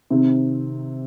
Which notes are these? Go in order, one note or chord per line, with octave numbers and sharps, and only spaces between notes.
C3 D#3 C4